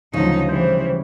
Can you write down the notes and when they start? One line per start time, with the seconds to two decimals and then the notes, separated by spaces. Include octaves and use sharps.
0.13 D2 C#3 F3 F#3 D#4
0.49 E3 G3 C5